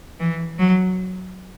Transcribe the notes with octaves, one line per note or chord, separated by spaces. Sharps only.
E3
F#3